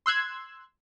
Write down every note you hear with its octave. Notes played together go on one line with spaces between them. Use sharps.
C6 E6 F#6 G#6